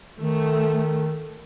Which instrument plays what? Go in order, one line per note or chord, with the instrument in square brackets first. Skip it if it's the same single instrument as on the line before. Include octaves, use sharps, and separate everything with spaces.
[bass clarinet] D#3 [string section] A3